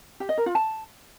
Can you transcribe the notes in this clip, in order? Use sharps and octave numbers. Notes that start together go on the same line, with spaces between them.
G4
D#5
A#4
F4
A5